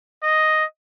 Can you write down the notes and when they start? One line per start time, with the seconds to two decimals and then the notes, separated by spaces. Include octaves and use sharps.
0.23 D#5